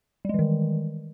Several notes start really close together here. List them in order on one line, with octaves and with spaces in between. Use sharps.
G3 G#3 E3 D#3